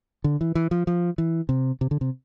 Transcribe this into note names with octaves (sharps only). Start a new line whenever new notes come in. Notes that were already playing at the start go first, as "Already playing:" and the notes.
D3
E3
E3
F3
F3
E3
C3
C3
D3
C3